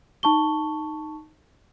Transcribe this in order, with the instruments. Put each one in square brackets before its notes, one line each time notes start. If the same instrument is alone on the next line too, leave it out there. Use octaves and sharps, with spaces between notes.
[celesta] D#4 A5 C#6 G7